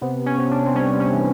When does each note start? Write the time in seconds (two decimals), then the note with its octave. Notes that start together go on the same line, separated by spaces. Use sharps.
0.01 C3 B3
0.26 C#4
0.38 C3
0.51 D4
0.66 C4
0.75 G3 C#4
1.00 C#4
1.13 E3